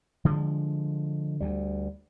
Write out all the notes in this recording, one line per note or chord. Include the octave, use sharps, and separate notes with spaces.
D3 F3 G#3
D2 G3